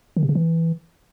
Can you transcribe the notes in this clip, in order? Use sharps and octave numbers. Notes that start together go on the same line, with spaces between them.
D#3
C3
C#3
E3